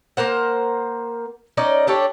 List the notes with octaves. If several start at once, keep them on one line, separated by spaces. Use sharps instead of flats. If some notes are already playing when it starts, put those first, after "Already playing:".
A#3 A#4 C5 F#5
C#4 D#4 D5 D#5
D4 G4 A4 C#5